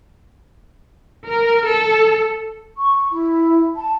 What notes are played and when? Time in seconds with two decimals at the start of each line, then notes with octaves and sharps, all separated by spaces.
1.25 A#4
1.65 A4
2.78 C#6
3.11 E4
3.76 A5